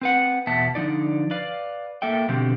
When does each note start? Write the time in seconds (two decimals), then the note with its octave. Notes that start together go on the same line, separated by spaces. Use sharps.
0.02 C4 B4 F#5
0.47 E2 B2 B3 E5 F#5 A5
0.75 D3 F3 D#4 D5
1.31 B4 D5 F5
2.02 A#3 A4 E5 G5
2.28 B2 D3 F3 C4 G4